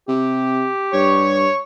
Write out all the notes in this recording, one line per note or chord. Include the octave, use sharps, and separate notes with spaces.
C3 G4
G2 C#5 C#6